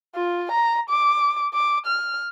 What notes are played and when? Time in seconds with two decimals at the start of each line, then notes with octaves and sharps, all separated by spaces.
0.15 F4
0.51 A#5
0.90 D6
1.54 D6
1.86 F6